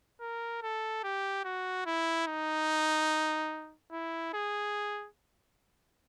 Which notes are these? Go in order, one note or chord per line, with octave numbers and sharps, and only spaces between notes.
A#4
A4
G4
F#4
E4
D#4
E4
G#4